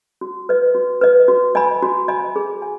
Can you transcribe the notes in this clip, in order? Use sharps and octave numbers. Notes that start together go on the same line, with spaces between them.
F#4
B4 D#5
F#4
B4 D#5
F#4
D#5 G#5 B5
F#4
D#5 G#5 B5
G#4
G#5